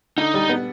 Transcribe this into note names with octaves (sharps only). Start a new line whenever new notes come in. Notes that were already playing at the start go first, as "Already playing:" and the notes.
D3 D#4
G3
B3